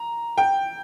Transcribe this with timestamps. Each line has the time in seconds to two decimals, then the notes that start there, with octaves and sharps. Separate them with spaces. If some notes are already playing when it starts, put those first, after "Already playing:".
Already playing: A#5
0.38 G5